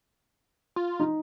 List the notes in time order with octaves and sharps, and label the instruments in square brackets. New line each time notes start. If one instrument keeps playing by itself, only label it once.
[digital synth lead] F4
[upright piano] D#4